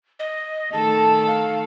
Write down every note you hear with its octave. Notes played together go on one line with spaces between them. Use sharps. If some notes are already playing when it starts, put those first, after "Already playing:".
D#5
D#3 A3 A4 A5
F5